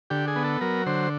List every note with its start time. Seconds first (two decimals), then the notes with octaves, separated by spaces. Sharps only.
0.10 D3 G4
0.28 G#4
0.36 B3
0.44 A4
0.61 F#3 A#4
0.86 D3 C5